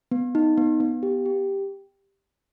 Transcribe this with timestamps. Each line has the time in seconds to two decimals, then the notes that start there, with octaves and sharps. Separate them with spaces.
0.11 B3
0.35 D#4
0.58 B3
0.80 B3
1.03 G4
1.26 G4